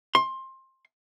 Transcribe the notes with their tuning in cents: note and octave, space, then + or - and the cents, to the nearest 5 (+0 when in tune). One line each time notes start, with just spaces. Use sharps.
C6 +20